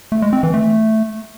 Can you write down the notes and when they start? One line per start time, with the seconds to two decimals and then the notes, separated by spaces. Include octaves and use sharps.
0.12 A3
0.22 G#3
0.33 C4
0.43 E3
0.54 A3